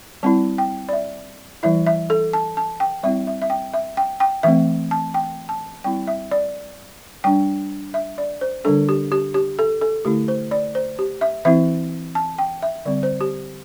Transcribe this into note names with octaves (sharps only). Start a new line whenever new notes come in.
G3 C4 E4 A5
G5
D5
E5
E3 G3 E4 E5
E5
A4
A5
A5
G5
G3 C4 E4 E5
E5
E5
G5
E5
G5
G5
E3 A3 C4 E5
A5
G5
A5
G3 C4 E4 G5
E5
D5
G3 D4 G5
E5
D5
C5
D3 G3 D4 A4
G4
G4
G4
A4
A4
D3 A3 E4 G4
C5
D5
C5
G4
E5
E3 C4 E4 E5
A5
G5
E5
D3 G3 C4 D5
C5
G4